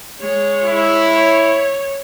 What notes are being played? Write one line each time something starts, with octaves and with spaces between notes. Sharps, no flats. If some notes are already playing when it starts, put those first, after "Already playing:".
G#3 C#5
E4
C#5